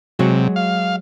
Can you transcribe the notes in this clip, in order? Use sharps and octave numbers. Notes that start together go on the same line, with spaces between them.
C3 F#3 G#3 F#4
F5